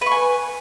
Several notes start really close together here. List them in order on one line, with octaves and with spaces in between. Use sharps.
B4 C#6 G#5